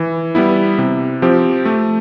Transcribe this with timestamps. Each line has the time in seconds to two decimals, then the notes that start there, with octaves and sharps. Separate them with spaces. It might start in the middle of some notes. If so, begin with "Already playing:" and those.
Already playing: E3
0.35 G3 B3 E4
0.78 C3
1.22 F3 C4 G4
1.65 A3